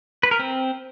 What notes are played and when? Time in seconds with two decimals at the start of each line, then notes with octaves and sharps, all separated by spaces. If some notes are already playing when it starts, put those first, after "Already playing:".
0.23 B4
0.31 A#4
0.39 C4